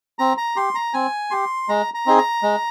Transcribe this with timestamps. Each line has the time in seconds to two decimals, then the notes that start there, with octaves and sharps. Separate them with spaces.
0.19 C4 A#5
0.38 A#5
0.56 G4 C6
0.75 A#5
0.94 C4 G#5
1.31 G4 C6
1.69 G#3 A#5
1.94 A#5
2.06 C4 D#4 G#4
2.18 A#5
2.43 G#3